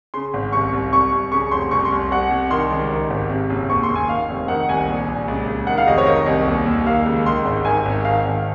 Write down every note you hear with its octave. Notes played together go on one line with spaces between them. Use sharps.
C#3 C6
G#1
C2 C#6
C2
C2 C#6
C2
C#3 C#6
F1 C6
C2 C#6
C6
C2
C2 F#5
C2
D#3 C6
C#2
D#3
G#1
C3
F#1
D#2 C#6
C6
D#2
G#5
D#3 F5
F1
D#3 F#5
C2 G#5
A#1
A#1
C#2
C#2
D#3 F#5
F5
F1 D#5
C#5
D#3 D#5
C2
D#2
D#2
D#3 F5
C#2
D#3 C6
G#1
D#3 G#5
G#1
D#3 F5
G#1